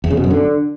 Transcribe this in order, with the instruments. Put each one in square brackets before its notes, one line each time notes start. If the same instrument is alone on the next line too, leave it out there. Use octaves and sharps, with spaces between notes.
[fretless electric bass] E2
C#3
B2
F#2
D3